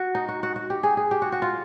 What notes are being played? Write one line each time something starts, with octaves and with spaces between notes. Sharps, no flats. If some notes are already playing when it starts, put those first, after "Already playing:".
Already playing: F#4
D#4
F#4
F#4
F#4
G4
G#4
G#4
G4
F#4
F#4
F4